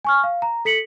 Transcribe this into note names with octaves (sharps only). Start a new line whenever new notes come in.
G#5 C#6 F6
F5
A#5
A4 B6 C#7 F#7